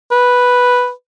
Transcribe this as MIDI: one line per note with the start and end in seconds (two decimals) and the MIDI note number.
0.12 0.91 71